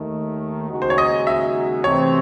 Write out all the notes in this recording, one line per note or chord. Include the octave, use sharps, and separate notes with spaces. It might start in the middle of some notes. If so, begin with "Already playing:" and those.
Already playing: D#2 D#3 A3
D#2 C#3 G#3 D#4 F#4
C5
C#5
D#5
E5
C3 E3 A3 C4 C#5